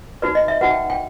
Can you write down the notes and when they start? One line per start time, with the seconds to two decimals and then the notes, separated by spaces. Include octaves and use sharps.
0.22 D#4 F#4 B4 D5
0.35 D#5
0.48 E5
0.61 D#4 F#4 B4 F#5
0.71 G5
0.90 G5